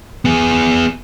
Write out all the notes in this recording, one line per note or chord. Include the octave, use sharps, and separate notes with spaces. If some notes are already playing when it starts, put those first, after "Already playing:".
B3 G#4